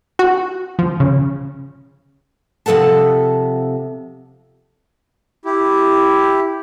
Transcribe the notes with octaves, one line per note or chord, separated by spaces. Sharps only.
F#4
F3
C#3
C3 F3 A4 F#5 A5
E4 G4